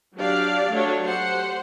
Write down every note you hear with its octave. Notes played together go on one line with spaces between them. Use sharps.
F#3 D4 G4 D5 F5
F#3 A3 D4 C#5
G4 C5 F#5